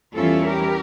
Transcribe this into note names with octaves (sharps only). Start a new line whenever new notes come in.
E2 E3 G3 C#4 E4 F4 A4
G4 A#4